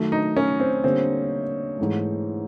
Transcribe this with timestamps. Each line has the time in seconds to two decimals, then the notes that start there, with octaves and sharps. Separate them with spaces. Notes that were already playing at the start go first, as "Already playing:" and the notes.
Already playing: D#3 F#3 A3
0.12 D#4
0.37 C#4
0.60 C4
0.84 D3 G3 A#3 C4
1.79 G#2 E3 A3